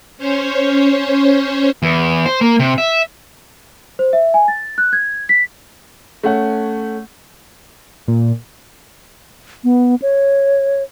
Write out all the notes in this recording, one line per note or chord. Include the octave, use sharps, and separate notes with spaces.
C#4 C5 C#5
E2
C5
A#3
C3
E5
C5
E5
G#5
A6
F#6
G#6
B6
A3 C#4 F#5
A#2
B3
C#5